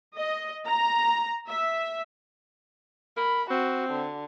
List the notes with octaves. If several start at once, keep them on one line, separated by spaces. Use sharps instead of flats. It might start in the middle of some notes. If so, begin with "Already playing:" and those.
D#5
A#5
E5
A#4 B5
C4 F#4
D3